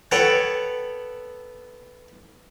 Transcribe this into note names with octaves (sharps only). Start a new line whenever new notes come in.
B3 A4 C#5 F#5 G5